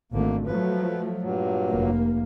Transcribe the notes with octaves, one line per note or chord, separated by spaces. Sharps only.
G#1 D3 A3 A#3
F3 F#3 A3 B4
G2 A#2 F#3
F1 A#3